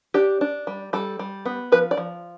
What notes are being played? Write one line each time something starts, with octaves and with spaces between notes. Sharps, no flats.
D4 G4
D4
G3
G3 A4
G3
B3
F3 B4
D5
F3